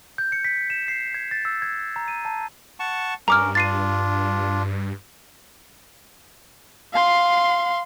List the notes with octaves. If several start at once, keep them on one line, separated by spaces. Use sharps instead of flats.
G6
C#7
B6
E7
C7
G#6
A6
E6
G#6
A#5
D#7
A5
F#5 A5 C#6
G2 C#4 A#4 A#5 D6 F6
D4 F4 A6 C7 D#7
F5 C6